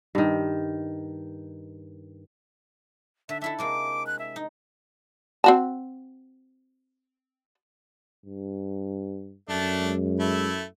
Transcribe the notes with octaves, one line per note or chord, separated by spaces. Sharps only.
G2 D#3
D3 E5
D4 E4 A4 E5
C3 G#3 A#3 D6
F#6
E5
D#4
C4 F#4 A5
G2
F#2 A3 D4
G#3
A3 E4